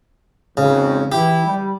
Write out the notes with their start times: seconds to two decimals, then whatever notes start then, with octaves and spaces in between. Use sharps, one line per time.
0.57 G#1 F2 C#3
1.12 E3 E4 G4
1.46 G3